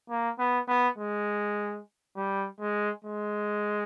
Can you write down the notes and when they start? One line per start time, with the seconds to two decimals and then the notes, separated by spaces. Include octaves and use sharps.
0.10 A#3
0.39 B3
0.68 B3
0.98 G#3
2.17 G3
2.60 G#3
3.05 G#3